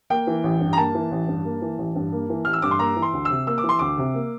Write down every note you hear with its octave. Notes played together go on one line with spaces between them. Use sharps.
A#3 G5
E3
A1
G2
A#5
A#3 A5
E3
A1
G2
A#3
E3
A1
G2
A#3
E3
A1 F6
E6
G2 D6
C6
A#3 A#5
E3
C6
D2
E6
C3
A#3 E6
D6
E3
C6
D2 D6
C3
A#3